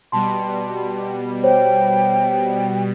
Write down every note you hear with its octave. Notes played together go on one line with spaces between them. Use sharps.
B2 G3 A5 C6
C5 C#5 G5